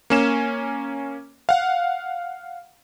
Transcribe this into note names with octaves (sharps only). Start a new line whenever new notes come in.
A#3 C#4 E7
F5 F#5